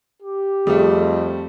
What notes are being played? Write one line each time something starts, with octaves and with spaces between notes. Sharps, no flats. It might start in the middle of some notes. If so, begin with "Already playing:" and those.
G4
F2 G3 A3 G#4